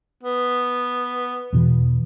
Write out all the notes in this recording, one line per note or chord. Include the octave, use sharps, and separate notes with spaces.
B3
E2 B2 E3